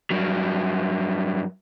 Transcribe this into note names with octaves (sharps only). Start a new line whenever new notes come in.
G2 F#3